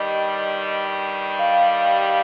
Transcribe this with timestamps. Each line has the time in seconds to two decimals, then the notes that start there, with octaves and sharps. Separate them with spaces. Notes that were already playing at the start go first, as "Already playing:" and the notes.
Already playing: G2 D#3 G3 D#5
1.39 F5